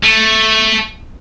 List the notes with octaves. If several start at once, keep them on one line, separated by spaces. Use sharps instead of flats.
A3